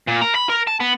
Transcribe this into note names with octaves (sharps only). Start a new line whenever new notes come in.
A#2
A#4
B5
A#4
A5
B3